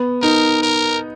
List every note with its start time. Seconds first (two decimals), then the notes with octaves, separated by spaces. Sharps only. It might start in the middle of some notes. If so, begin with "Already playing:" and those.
Already playing: B3
0.22 D#4 A#4
0.63 A#4